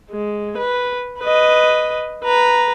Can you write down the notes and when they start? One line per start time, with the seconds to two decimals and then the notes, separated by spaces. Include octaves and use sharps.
0.11 G#3
0.58 B4
1.20 B4 D#5
2.25 B4 A#5